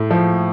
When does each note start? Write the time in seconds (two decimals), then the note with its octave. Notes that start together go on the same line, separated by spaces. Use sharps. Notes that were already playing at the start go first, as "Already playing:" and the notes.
Already playing: A2
0.11 F3